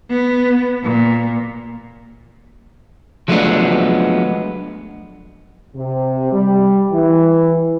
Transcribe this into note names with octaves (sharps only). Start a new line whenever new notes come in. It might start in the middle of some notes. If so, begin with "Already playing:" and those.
B3
A#2
F3 F#3 G#3 A3 B3 D4
C3
G3
E3